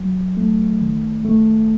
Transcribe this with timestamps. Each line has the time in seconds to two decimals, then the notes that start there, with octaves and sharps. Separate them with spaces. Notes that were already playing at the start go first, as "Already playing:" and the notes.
Already playing: F#3
0.37 A3
0.81 D#3
1.25 A3